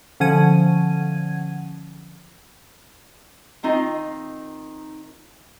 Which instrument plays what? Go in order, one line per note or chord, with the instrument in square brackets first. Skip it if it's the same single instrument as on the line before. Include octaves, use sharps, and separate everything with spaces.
[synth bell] D3 F3 C#4 F#5 G#6 D#7
[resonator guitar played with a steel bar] D#3 C4 D#4 F4 D#5